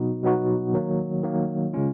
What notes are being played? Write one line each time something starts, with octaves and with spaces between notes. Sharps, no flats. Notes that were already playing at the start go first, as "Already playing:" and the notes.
Already playing: B2 F#3 B3 D#4 F#4
B2 F#3 B3 D#4 F#4
D#3 F#3 A#3
D#3 F#3 A#3
C#3 G#3 C#4 F4